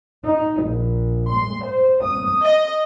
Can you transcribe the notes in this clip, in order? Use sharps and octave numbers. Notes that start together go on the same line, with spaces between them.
D#4
A#1
C6
C5
D#6
D#5